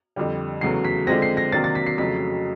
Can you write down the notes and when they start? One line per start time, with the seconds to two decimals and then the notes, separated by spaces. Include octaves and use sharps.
0.16 F2 D3 G3
0.61 E2 C#3 F#3 A3 C7
0.85 B6
1.07 D3 F3 G#3 C4 A#6
1.22 C7
1.37 A#6
1.52 C3 D#3 F#3 A#3 D4 A6
1.64 A6
1.75 B6
1.86 C7
1.98 F2 C#3 F#3 A3 B6